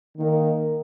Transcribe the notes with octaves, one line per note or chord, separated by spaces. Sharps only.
D#3 A#3 D#4 A#4